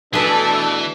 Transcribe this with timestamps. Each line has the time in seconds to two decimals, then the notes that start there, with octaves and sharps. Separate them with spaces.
0.14 B2 E3 A3 D4 G#4 A4 B4 E6